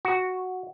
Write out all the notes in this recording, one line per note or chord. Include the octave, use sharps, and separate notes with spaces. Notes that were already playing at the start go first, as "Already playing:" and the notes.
F#4